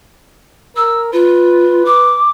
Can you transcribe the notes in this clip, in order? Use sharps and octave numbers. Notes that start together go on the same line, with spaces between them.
A#4 E6
F4 B4
D6